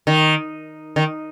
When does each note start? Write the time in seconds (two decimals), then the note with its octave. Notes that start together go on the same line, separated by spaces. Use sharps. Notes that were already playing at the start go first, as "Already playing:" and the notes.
0.07 D#3
0.96 D#3